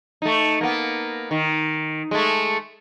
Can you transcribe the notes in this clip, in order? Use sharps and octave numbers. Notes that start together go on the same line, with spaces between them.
A3 D#4
A#3 B3
D#3
G#3 A3